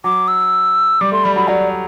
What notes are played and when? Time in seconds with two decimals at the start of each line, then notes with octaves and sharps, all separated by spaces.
0.04 F#3 D6
0.28 E6
1.01 G3 D6
1.12 A3 C6
1.24 G3 B5
1.36 F#3 B5
1.48 F#3 D5